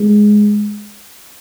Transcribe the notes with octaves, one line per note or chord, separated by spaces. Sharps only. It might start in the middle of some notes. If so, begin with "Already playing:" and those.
Already playing: G#3